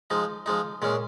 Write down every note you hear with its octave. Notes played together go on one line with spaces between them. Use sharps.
F3 G#3 D#4
F3 G#3 D#4
A#2 G#3 C#4